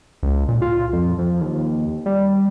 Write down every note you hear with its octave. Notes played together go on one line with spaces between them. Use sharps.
C#2
A#2
F4
F2
F2
D#2
G3